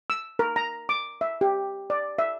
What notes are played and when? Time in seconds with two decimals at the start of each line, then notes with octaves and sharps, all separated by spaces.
0.10 E6
0.39 A#4
0.56 A#5
0.89 D6
1.21 E5
1.41 G4
1.90 D5
2.19 E5